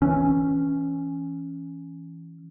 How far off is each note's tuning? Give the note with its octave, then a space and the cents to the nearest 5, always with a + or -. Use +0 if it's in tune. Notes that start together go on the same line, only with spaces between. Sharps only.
E3 +0 C#4 +0